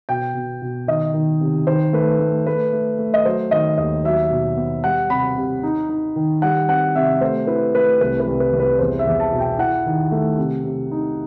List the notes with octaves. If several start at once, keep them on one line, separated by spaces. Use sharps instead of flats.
B2 G5
B2
B2
D#3 D#5
D#3
C3
D#3 C5
A3 B4
A3
A3 B4
A3
A3
D#5
F#3 C5
D#3 D#5
D#2 D#5
F#3 E5
B2
B3
G3 F#5
C3 B5
C3
D#4
D#4
D#3
G3 F#5
C4 F#5
C3 E5
A3 C5
E4 B4
A3 B4
C2 B4
B4
C2
B4
C2
B4
E2 C5
E5
E2
A5
B2
G5
E4 F#5
D#3
A3
C3
C3
D#4